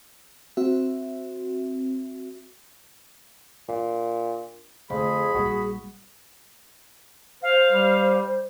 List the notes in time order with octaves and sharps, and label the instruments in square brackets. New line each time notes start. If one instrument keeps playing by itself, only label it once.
[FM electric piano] C4 F#4 E5
[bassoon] A#2 [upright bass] D4
[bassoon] F2 [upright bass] D3 A3 [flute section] G#4 [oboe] B5
[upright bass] A#1 G3 [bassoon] F#4
[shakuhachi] C5 [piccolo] F5
[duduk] G3